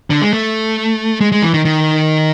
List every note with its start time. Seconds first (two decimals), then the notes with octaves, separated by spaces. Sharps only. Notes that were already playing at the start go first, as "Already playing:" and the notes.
0.10 D3
0.22 G#3
0.33 A3
1.21 G#3
1.32 G#3
1.42 E3
1.54 D#3
1.65 D#3